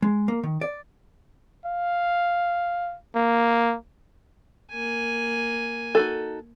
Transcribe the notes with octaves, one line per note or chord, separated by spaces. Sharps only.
G#3
A#3
D#3
D5
F5
A#3
A#3 G#5
D#4 F#4 A4